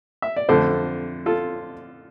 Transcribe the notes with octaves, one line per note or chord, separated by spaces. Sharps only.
E5
D5
F2 D3 A3 A4 C5
F4 A4